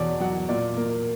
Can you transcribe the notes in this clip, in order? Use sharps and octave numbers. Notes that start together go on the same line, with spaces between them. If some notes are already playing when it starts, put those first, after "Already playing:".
Already playing: E2 B2 C#5 D5
F#3 F#5
A#2 D5
A#3